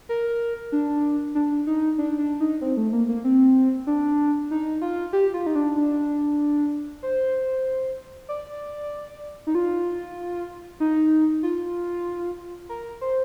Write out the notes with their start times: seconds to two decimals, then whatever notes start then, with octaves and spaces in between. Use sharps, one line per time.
0.09 A#4
0.72 D4
1.35 D4
1.67 D#4
1.98 D4
2.19 D4
2.40 D#4
2.62 C4
2.77 A3
2.93 A#3
3.09 A#3
3.24 C4
3.87 D4
4.51 D#4
4.81 F4
5.13 G4
5.34 F4
5.46 D#4
5.55 D4
5.76 D4
7.03 C5
8.29 D5
9.47 D#4
9.55 F4
10.80 D#4
11.43 F4
12.69 A#4
13.01 C5